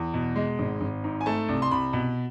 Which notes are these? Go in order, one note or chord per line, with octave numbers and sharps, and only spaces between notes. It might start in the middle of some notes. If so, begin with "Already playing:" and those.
Already playing: E2
B2
G#3
G#1
G#1
G#2
G#5
A3 A5
C2
C6
C2 B5
B2